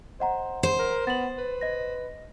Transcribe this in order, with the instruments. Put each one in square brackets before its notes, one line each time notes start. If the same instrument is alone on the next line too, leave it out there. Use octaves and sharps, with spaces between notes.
[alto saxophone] C5 [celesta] D#5 F#5 A#5
[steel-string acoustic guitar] C5
[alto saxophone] A#4
[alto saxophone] B3 [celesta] A6 F#7
[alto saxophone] B4
[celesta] D#5 A#6